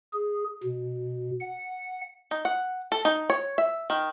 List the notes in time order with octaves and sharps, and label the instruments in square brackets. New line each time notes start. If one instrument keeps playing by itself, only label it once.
[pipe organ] G#4
B2
F#5
[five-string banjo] D#4
F#5
A4
D#4
C#5
E5
D#3